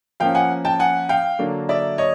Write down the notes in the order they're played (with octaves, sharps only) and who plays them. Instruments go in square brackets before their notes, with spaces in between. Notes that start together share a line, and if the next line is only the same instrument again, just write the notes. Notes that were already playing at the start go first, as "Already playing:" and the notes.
[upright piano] F3 A#3 C#4 F5 G5
F#5 G#5
G5 A5
F#5 G#5
F5 G5
D3 F#3 A#3 D4
D5 E5
C#5 D#5